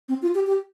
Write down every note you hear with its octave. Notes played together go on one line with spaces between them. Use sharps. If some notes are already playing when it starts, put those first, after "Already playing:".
C4
F4
G4
G4